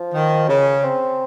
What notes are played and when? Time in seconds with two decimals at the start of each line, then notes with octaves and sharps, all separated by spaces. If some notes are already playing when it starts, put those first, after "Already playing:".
Already playing: F3
0.13 D#3
0.49 C#3 C#4
0.84 C4